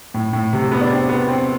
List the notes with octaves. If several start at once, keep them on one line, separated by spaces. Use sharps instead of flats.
A2
A2
C3
B3
D4
C4
B3
C4